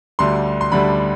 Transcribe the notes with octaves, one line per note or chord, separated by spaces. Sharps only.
D2 D3 G3 C6
C6
D2 D3 G3 B5